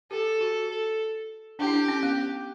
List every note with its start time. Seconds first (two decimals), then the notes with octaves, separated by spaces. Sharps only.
0.11 G4 A4
0.41 F#4
0.70 A4
1.59 D4 G4
1.67 E4
1.74 D4
1.88 C#4
2.03 B3